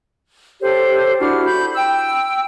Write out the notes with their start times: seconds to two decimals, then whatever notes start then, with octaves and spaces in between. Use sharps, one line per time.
0.62 G4 A4 C5 C#5
1.20 D4 E4 F#4 F6
1.46 B5 G6
1.75 G5 E6